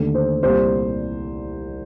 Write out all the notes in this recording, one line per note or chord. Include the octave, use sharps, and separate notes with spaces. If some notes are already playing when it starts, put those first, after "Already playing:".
Already playing: D#2 D3 A3
C5
C2 A#2 G3 C5